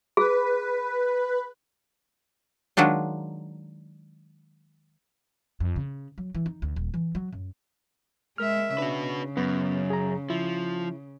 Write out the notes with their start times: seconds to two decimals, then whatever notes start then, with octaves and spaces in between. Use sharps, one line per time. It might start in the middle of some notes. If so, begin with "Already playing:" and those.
0.17 G#4 B4
2.77 D#3 F#3 G#3 D4 F4
5.60 F2
5.76 C#3
6.18 F#3
6.35 E3
6.46 D#4
6.62 D2
6.76 D#1
6.94 E3
7.15 F#3
7.33 F#2
8.38 G#3 A#4 E5 F6
8.78 C#3 D4 F#4 B4
9.37 F#2 B3
9.90 G#4 A#5
10.30 F3 E4